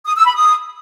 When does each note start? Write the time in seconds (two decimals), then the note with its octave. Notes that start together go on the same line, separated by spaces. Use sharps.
0.06 D#6
0.16 E6
0.25 B5
0.35 D#6